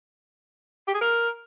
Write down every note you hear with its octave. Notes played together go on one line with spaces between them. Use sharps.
G4
G#4
A#4